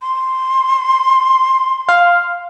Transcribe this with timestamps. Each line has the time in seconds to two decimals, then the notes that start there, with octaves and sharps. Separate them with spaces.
0.02 C6
1.89 F5